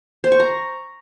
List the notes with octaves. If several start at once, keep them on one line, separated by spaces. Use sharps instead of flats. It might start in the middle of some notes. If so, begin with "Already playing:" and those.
C5
C#6
A#5